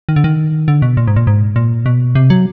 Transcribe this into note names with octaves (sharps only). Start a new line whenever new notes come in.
D#3
D3
D#3
D3
B2
A#2
G#2
A#2
G#2
A#2
B2
C3
F#3